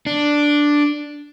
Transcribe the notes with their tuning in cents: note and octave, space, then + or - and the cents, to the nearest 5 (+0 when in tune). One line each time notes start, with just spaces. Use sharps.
D4 +0